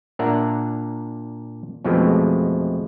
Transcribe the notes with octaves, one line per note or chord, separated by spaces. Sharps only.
A#2 D4 A#4 E5 F#5 A#5
F2 B2 E3 F3 G#3 A3